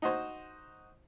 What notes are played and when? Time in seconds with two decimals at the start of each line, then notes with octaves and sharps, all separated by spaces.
0.02 D#4 F#4 C5